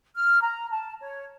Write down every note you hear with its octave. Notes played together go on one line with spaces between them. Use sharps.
F6
A#5
A5
C#5